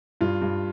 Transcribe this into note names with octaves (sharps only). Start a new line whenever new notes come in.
G2 F4
G2